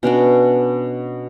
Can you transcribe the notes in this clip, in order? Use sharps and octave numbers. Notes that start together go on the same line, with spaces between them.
B2 C#4 D4 F#4